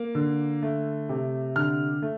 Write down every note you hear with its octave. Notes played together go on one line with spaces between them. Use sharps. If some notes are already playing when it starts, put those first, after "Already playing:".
Already playing: A#3
D3
A3
C3
D3 F6
A3